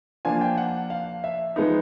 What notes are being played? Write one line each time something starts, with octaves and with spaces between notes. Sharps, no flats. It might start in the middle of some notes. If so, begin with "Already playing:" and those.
F3 A#3 D4 F4 G#5
G5
F#5
F5
E5
F3 G#3 B3 D#4